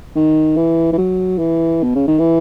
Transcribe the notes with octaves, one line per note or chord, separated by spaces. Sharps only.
D#3
E3
E3
F#3
E3
B2
C#3
D#3
E3